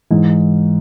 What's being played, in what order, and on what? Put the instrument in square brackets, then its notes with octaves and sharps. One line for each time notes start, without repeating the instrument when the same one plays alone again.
[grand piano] G#2 [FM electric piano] E3